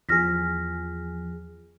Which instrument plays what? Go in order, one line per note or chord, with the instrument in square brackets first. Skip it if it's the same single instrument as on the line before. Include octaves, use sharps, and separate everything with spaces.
[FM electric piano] E2 F3 G#4 [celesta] F6 A#6 B6